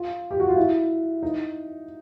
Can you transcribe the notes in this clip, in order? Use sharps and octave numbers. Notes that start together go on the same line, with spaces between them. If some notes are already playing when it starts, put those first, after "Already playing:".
Already playing: F4
G4
F#4
F4
E4
D#4